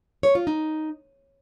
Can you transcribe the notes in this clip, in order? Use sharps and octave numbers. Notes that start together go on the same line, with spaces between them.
C#5
F4
D#4